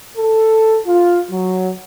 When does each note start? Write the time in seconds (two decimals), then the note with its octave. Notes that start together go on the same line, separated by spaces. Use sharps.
0.18 A4
0.87 F4
1.30 F#3